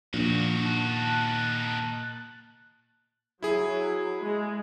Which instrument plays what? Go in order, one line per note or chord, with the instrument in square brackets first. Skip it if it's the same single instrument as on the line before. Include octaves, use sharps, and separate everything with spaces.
[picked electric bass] A#2 [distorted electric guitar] D#3 F#4 [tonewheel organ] F3 D4
[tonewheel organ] A5 F#6
[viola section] F#3 [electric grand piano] E4 G#4
[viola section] G#3